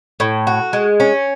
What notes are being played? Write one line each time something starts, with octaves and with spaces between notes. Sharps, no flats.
A2
F#4
G#3
C#4